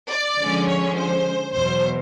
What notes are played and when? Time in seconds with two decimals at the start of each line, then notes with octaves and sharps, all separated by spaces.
0.11 D5
0.39 D3 F3 G#3 C#4
0.68 C#5
0.98 C5
1.55 E2 B2 F#3 C5